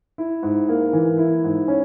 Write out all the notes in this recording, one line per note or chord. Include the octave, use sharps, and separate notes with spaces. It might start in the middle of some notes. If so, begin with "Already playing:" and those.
E4
G#2
A#3
E3
E4
G#2
C#4